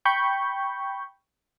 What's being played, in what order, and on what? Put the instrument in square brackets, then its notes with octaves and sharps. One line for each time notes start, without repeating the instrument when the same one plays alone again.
[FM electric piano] G5 B5 C#6 G6